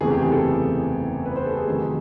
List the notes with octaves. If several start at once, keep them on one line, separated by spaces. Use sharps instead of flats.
F#1 E2 C3 E3 A3 G#4
G4
G#4
A4
B4
C5
A4
G#4
F2 C3 D#3 F#3 A3